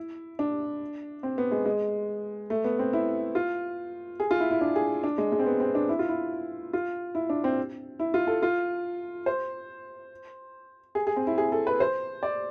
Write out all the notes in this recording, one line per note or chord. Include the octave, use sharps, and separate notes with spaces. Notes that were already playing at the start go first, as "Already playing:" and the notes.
Already playing: E4
D4
C4
B3
G#3
G#3
A3
B3
C4
E4
F4
G#4
F4
E4
E4
D4
G#4
D4
G#3
G#3
C4
B3
C4
D4
E4
F4
E4
F4
E4
D4
C4
E4
F4
A4
F4
C5
G#4
G#4
C4
E4
G#4
A4
B4
C5
D5